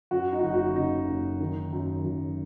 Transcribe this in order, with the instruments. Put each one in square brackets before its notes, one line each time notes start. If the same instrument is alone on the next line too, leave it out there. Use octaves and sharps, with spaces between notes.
[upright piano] F#2 F#4
D#4
F#4
F#1 D#4
F#4
C#3 D#4
F#1
D#3
F#2
F#2